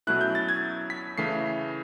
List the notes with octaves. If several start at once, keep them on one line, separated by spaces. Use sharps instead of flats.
B2 F#3 A3 C#4 E4 F#6
G6
A6
G#6
B6
C#3 E3 A3 C7